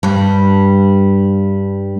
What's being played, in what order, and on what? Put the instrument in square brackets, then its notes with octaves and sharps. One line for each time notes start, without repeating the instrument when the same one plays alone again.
[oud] G2 G3